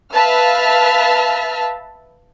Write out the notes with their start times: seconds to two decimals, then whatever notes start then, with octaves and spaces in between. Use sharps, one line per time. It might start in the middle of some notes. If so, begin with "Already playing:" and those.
0.13 B4 E5 F5 A5 F6